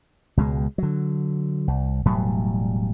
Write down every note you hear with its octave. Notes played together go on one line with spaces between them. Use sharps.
C#2 B2 G3 G#3
D3 F#3
C2
E1 A2 F#3 G3